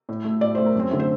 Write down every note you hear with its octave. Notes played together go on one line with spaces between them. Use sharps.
A2
A3
A2 D5
A3 C5
A#4
F#2 C4 C5
D3 A3
C5